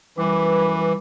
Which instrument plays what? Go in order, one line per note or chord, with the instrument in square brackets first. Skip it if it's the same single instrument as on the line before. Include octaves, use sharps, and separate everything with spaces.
[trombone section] F#2 B4 [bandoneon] E3 [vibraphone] G3 D6